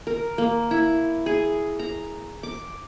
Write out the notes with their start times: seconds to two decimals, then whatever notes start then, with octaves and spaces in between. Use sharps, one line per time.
0.07 A#4
0.38 A#3
0.71 E4
1.26 G#4
1.79 A#5
2.43 D6